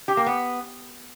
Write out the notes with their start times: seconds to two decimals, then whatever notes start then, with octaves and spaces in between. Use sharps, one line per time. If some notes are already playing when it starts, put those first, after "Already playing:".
0.08 G4
0.17 A#3
0.26 B3